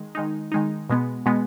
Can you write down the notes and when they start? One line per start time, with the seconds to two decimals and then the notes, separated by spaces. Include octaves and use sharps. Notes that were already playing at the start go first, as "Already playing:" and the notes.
Already playing: D#3 G#3
0.15 D#3 G#3 D#4
0.52 D#3 G#3 D#4
0.90 B2 G#3 B3
1.26 B2 G#3 B3